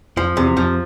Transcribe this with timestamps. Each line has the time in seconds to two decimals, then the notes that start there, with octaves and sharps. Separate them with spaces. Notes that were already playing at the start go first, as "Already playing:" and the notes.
0.16 F2 F3
0.37 E2 C3
0.56 F2 F3